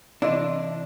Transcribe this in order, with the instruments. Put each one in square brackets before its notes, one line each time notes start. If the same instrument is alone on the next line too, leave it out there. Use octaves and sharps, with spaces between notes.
[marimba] C3 E3 C4 [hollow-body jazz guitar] D4 [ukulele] E4 D#5